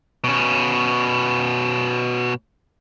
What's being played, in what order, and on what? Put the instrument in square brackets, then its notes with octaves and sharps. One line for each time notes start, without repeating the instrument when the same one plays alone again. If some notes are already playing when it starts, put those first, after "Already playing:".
[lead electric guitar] B2 C#4